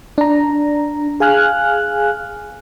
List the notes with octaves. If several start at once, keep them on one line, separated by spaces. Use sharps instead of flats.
D4 A#5
G#4 F5 G#5 F6 F#6